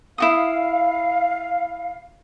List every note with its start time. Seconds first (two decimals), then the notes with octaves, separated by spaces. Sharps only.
0.18 E4 F#4 F5 D#6